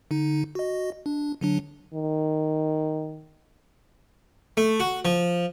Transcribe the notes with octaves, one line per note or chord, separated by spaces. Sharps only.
D3 D#4
F#4 D#5
D4
D3 F#3 D4
D#3
A3
F#4
F3